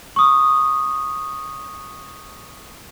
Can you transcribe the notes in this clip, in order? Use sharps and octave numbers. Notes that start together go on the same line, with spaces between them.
C#6 D#6